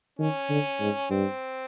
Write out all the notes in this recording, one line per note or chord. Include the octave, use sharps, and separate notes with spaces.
D#3 C#4
D3
G#2
G2 C4